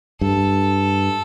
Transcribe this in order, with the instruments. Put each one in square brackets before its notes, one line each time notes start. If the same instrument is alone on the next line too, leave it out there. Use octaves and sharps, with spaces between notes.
[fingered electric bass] G2 [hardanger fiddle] A4